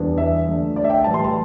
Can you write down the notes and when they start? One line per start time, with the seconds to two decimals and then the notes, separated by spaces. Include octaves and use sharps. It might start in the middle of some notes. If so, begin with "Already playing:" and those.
Already playing: E2 E3 G3 D4
0.18 E5
0.47 D3 A3 D4
0.76 D5
0.84 E5
0.90 G5
1.04 A2 E3 G3 A5
1.14 C6
1.24 A5